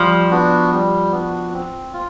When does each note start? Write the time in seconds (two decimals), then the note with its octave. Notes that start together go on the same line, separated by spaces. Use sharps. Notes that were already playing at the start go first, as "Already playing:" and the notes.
Already playing: F3 G3
0.31 B3 D4 F#4
0.71 G3
1.12 B3 D4 F#4
1.53 C4
1.93 F4